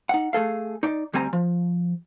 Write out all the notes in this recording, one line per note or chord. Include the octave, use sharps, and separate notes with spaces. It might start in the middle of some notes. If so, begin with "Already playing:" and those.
D#4 F#5
A3 G#4 A4 F5
D#4 D5
D2 G3 C4 G#5 A#5
F3